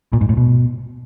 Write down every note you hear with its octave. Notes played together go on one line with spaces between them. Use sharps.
A#2
G#2
A2
B2